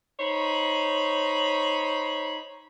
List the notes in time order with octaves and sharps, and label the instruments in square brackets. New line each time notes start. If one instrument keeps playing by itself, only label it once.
[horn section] D#4 C5 C#5 B5